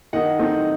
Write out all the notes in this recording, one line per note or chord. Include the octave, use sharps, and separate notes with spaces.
D#3 D#5 F#5
A3 C4 D#4